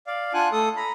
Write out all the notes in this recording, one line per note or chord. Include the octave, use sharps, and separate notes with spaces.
D5 F5
D4 F4 F#5 G#5 F#6
A3 A4 D#6
A#5 B5